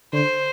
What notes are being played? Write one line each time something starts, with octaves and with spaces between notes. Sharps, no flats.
D3 C5